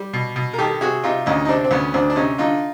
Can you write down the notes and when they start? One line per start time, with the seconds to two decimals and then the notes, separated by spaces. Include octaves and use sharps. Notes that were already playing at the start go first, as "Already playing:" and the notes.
Already playing: G3
0.13 B2
0.36 B2
0.54 A#4
0.58 D#3 G4 A4
0.81 C3 F#4 G#4
1.03 C3 D#4 F4
1.26 D2 C#4 D#4
1.45 D#4
1.48 C3 C4 D4
1.64 C4
1.71 D2 B3 C#4
1.94 D2 C4 D4
2.10 D4
2.16 C3 C#4 D#4
2.38 D3 D#4 F4